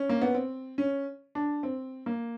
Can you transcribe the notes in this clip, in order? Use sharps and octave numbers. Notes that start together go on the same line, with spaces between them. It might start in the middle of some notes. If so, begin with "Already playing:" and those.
Already playing: C#4
A#3
B3
C4
C#4
D4
C4
A#3